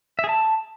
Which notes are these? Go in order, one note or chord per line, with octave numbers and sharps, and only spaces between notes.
E5
G#4
A5